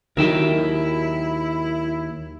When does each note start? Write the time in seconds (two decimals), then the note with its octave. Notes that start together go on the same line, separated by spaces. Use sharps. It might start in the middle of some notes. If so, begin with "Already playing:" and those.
0.17 D#2 D#3 F#3 E4 A#4 E5 G5